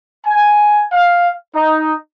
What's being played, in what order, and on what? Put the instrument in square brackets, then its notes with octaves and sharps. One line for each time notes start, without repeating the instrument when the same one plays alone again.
[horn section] G#5
F5
D#4